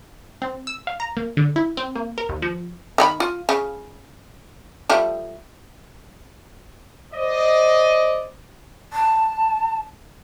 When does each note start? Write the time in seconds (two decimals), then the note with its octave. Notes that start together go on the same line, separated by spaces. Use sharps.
0.42 C4
0.67 E6
0.87 F5
1.00 A#5
1.17 A#3
1.37 D3
1.56 E4
1.77 C4
1.95 A#3
2.18 A#4
2.29 D#2
2.42 F3
2.98 D#3 G4 B5
3.20 F4
3.49 C#3
4.89 F3 G3 A3
7.14 C5 D5 D#5
8.93 A5